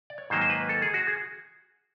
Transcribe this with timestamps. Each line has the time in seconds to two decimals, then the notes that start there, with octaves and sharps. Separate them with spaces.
0.10 D5
0.18 C#5
0.30 G#2 D#3 F#3 A#3 C5
0.41 C5
0.50 B4
0.69 A4
0.82 G#4
0.94 F#4
1.07 G#4